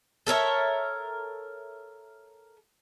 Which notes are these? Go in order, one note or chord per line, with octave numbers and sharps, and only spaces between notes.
A4 A#4 C#5 E5